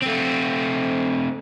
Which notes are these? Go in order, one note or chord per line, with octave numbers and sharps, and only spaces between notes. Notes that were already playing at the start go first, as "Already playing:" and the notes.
A3 C4